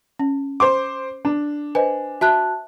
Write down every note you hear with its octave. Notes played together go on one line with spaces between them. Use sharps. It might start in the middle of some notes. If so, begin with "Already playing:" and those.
C#4
C5 C6 D6
D4
B4 C5 D#5 G#5
F#4 E5 A5 F#6